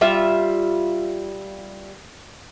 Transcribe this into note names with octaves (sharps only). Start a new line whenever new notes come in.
G3 F4 E5